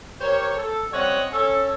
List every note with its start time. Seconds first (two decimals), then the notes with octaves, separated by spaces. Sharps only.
0.21 G4 A#4 C5 C#5
0.56 A4
0.92 G3 C4 C#4 C#5 D#5 F#5
1.31 C#4 A4 C#5